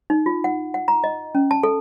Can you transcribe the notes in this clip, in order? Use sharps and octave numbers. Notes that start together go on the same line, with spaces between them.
D#4
F4
F#5
F#5
A#5
D#5
C#4
A5
A4